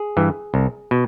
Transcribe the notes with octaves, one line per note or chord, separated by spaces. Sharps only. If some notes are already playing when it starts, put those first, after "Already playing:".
Already playing: G#4
G2 E3
C2
B2